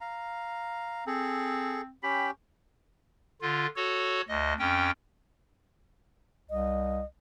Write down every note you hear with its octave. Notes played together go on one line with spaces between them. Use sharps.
F5 A#5
C4 G#4 A4
C#4 G4 G5 B5
D3 F4
F#4 A4 C#5
D2 D#5
F2 C#4 G5
C2 D#5